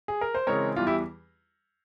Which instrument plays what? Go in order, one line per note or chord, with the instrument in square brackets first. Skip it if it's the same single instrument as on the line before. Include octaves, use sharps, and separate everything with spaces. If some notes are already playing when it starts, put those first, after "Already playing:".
[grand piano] G#4
A#4
C5
C#3 E3 G#3 C4 A#4 C#5
E2 E3 G3 F4
E4 G4